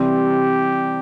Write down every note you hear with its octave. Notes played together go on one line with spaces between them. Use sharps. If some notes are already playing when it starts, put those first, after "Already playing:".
Already playing: C3 E3 G3 C4 G4